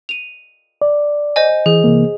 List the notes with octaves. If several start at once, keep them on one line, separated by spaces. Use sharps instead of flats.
D#7 F7
D5
C5 D#5 G#5
E3 G#4
C3 E3 A#3